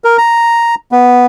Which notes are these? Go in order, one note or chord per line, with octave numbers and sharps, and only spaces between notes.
A#4
A#5
B3